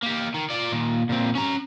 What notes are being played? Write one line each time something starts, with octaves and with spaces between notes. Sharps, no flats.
A#3 G4
D#3
F4 D5
A#2 D#3
A#2 C4
C#4 A#5